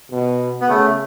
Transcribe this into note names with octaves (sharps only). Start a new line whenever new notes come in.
B2
B3
C#3 A3